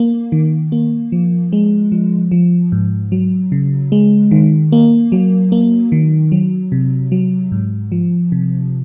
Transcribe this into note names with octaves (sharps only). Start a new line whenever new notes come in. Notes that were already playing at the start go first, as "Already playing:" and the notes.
Already playing: A#3
D#3
A#3
F3
G#3
F3
F3
G#2
F#3
C#3
G#3
D#3
A#3
F#3
A#3
D#3
F#3
C3
F#3
G#2
F3
C3